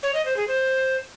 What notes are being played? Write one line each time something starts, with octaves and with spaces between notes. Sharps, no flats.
C#5
D#5
C5
G#4
C5